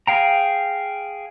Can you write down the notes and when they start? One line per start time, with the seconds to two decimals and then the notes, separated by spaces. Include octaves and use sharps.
0.07 G#4 F5 G5 A#5